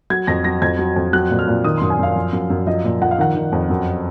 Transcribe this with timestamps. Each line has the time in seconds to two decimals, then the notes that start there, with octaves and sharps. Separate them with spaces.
0.10 F#3 G#6
0.27 F2 A#6
0.44 F#3 A#6
0.62 F2 G#6
0.79 F#3
0.96 F2
1.13 F#3 F#6
1.30 A#2
1.39 F6
1.47 A#2
1.64 D#3 D#6
1.78 F#2 C6
1.90 G#5
1.99 F#2 F5
2.16 F3
2.33 F#2
2.50 F#2
2.67 F3 D#5
2.84 A#2
3.01 F3 F#5
3.11 F5
3.18 D#3 F#5
3.35 D#3
3.52 F2
3.70 F#2